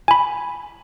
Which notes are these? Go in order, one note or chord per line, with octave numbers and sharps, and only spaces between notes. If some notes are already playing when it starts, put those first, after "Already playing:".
G#5 B5